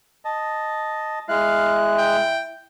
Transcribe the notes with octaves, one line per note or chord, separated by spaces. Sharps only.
D#5 A5
G#3 E4 F5 F#6
G5